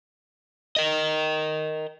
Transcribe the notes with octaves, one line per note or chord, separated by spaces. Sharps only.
A#4 D#5